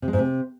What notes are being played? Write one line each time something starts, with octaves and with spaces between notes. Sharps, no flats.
C3
G#3
G#2
C3